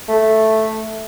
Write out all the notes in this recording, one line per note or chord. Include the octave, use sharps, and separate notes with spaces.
A3